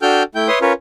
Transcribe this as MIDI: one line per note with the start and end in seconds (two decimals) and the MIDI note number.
0.02 0.23 62
0.02 0.23 66
0.02 0.23 69
0.02 0.23 79
0.02 0.23 89
0.02 0.23 91
0.35 0.48 57
0.35 0.48 64
0.35 0.48 79
0.35 0.48 91
0.48 0.59 71
0.48 0.59 73
0.48 0.59 76
0.48 0.59 84
0.48 0.59 87
0.61 0.73 61
0.61 0.73 65
0.61 0.73 70
0.61 0.73 71
0.61 0.73 73